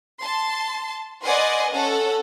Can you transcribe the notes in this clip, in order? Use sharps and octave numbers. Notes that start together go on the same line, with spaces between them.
A5 C6
B4 D5 D#5 F#5 G#5 C6
C#4 A4 F#5